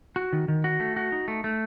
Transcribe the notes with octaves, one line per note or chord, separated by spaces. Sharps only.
F#4
D#3
D#3
F#4
A3
F#4
D#4
A3
A3